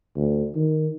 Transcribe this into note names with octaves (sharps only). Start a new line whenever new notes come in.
D2
D#3